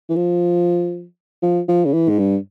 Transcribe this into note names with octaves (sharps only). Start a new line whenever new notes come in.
E3
F3
F3
F3
C#3
E3
G#2
G2